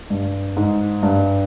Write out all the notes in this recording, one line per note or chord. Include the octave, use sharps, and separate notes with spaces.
G2
G#2
G2